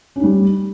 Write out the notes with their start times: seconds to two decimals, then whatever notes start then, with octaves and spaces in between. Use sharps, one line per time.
0.16 C#4
0.20 D#4
0.23 G3